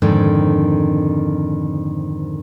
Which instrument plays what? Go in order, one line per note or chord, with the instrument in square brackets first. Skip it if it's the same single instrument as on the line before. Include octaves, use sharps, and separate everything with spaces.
[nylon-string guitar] F2 G#2 D3 D#3